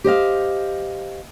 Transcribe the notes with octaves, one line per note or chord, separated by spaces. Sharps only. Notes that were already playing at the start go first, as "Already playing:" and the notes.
G4 C5 D#5 F5